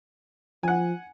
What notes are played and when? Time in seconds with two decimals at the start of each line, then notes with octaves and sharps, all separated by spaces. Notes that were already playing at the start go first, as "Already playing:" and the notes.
0.63 F3 F#5 G#5